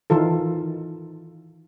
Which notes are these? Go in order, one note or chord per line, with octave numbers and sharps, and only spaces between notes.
D#3 E3 F4 A4